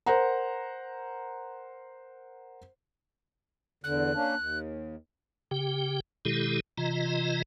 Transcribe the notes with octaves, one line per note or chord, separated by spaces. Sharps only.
A#4 C5 F#5 A#5
E2 D3 F#6
A#3 C#4 D4
D#2
C#3 G4 G5
B2 D#3 G#3 E4 G4 A4
C3 E3 F4 D#5 A#5